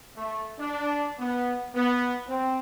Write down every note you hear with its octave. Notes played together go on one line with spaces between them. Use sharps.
A3
D4
B3
B3
C4